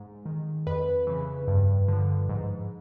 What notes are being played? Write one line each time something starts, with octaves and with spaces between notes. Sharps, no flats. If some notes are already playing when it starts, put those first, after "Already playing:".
Already playing: G#2
D#3
F2 B4
C#3 E3
G2
D3 F3
G#2